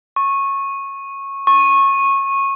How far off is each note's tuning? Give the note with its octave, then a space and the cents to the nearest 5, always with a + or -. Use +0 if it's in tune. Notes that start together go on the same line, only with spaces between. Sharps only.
C#6 -15
C#6 -20